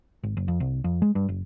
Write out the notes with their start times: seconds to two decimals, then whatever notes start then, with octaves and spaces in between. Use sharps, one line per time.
0.23 G#1
0.37 F#1
0.48 F2
0.60 C2
0.84 F2
1.02 G#3
1.15 G2
1.29 F#1